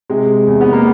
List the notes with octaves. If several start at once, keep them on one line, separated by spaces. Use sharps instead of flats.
C3 G#3
E2
B3
A#3